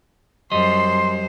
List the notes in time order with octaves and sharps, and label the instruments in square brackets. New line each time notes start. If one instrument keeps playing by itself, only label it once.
[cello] F#2 C5 [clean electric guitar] G3 D#5 [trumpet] C6